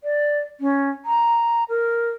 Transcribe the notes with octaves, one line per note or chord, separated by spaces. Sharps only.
D5
C#4
A#5
A#4